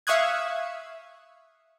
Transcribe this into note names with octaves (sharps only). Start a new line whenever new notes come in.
E5 F5 C#6 D#6 F#6 G#6